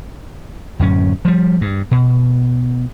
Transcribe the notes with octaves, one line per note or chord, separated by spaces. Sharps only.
D1 F#2 C#4
F3 G3
G2
B2